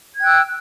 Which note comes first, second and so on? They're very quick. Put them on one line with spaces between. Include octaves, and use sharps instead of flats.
G#6 G5 F#6 E6